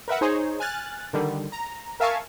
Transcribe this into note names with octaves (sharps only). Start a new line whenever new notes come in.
A#4 B4 E5 F#5
D#4 G#4 C5 C#5
G#5 F6 F#6 A6
D3 D#3 G3
A#5
A#4 E5 F5 G#5 A5 C#6